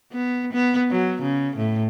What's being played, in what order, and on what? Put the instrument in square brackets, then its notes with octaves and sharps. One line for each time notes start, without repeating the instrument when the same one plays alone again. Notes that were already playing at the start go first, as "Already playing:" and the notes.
[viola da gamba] B3
B3
F#3
C#3
A2